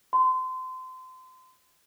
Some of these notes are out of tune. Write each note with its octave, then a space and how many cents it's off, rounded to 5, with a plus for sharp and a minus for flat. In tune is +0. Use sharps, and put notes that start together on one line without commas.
C6 -30